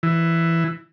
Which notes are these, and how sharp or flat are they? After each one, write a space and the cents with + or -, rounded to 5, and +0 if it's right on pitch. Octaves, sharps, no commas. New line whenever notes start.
E3 +10